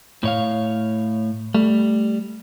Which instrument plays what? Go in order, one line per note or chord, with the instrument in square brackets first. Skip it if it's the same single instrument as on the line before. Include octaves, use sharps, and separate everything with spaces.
[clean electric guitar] A2 C#5 F5
[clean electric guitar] G3 [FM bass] A3